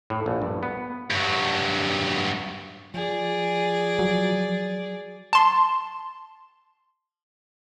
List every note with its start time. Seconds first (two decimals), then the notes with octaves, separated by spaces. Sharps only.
0.10 A2
0.26 A#1
0.42 G2
0.63 B3
1.11 G2 F#3
2.94 F3 G#4 D5
3.99 F#3
5.33 A5 C6